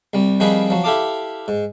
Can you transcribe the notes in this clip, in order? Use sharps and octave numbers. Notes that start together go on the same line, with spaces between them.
C2 G3
D#3 F3 G3 C4 G#4 B4
F3 F#3
E4 G4 A4 F5 A5 D6
G#2